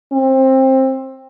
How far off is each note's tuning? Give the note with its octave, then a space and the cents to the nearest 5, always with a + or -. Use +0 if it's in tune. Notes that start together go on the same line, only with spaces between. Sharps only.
C4 +20